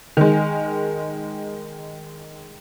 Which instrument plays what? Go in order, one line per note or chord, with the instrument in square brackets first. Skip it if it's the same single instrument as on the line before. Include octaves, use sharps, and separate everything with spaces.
[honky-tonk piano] D#3 G#3